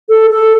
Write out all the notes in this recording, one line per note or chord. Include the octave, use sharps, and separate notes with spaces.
A4
A4